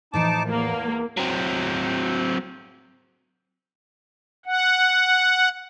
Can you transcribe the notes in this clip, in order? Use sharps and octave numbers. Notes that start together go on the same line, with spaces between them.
A2 E3 F3 D#4 A5 D6
E2 A#3
F#3 C4
F#5